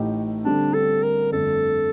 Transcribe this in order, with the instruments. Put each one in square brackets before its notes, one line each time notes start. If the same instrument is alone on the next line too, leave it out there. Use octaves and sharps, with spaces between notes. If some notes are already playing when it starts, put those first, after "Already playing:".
Already playing: [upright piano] A1 A2 A3 D#4 G4
[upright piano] D3 G3 C4 [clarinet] D4
[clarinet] A4
A#4
[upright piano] G1 F2 D3 A3 [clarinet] A4